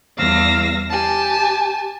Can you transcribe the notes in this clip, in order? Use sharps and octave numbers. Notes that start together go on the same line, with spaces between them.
E2 G3 F5 E6 A#6
G4 G#5 A5